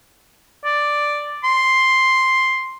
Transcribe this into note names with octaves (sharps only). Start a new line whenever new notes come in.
D5
C6